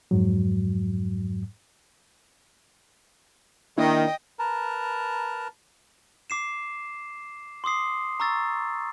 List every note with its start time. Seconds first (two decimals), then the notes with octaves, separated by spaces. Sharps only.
0.11 F2 G#2 F#3
3.78 D#3 A#3 D4 E4 D#5 G5
4.39 A#4 B4 A5 A#5
6.30 D6 C7 E7
7.64 C6 D6 D#6 C7
8.20 A#5 C#6 E6 A6